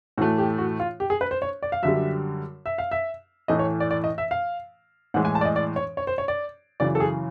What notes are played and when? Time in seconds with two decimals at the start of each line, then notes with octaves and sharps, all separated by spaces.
0.17 A2 E3 A3 F#4
0.38 G4
0.58 F#4
0.80 F4
1.00 G4
1.10 G#4
1.21 B4
1.31 C5
1.42 C#5
1.63 D5
1.72 F5
1.83 F#2 D3 G3 E5
2.66 E5
2.78 F5
2.91 E5
3.48 A2 E3 A3 D#5
3.59 C#5
3.80 D5
3.91 D5
4.04 D#5
4.18 E5
4.31 F5
5.14 A2 E3 G#3 F#5
5.25 G#5
5.35 A5
5.41 D5
5.45 D#5
5.56 D5
5.76 C#5
5.97 C#5
6.07 C5
6.18 C#5
6.28 D5
6.80 F#2 C#3 E3 D5
6.95 A4
7.00 G#4